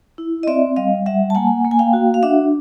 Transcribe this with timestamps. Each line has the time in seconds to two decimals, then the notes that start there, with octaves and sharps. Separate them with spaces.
0.18 E4
0.43 D#5
0.47 C4 D5 E5
0.76 G3 D#5 F5
1.06 G3 E5 F#5
1.30 A5
1.35 A#3 F#5 G#5
1.65 A#3
1.71 G#5
1.79 F5 G5
1.93 F#4
2.14 F5
2.23 D4 E5 F#5